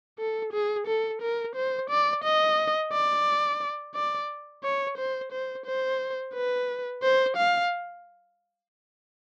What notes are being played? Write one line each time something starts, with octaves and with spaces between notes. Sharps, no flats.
A4
G#4
A4
A#4
C5
D5
D#5
D5
D5
C#5
C5
C5
C5
B4
C5
F5